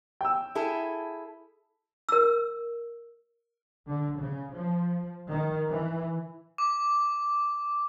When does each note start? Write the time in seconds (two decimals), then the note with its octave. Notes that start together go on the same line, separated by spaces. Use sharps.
0.21 G5 E6
0.55 E4 G#4 A4
2.09 A#4 E6
3.87 D3
4.17 C#3
4.52 F3
5.31 D#3
5.68 E3
6.58 D6